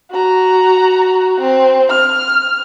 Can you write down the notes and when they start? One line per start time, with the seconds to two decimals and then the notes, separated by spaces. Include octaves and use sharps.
0.11 F#4 A#5
1.40 C4
1.89 F6